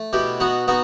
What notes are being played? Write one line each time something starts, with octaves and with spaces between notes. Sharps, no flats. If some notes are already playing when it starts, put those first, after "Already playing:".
Already playing: A3
B2 E4 G4
B3 D#4 F#4
B3 D#4 F#4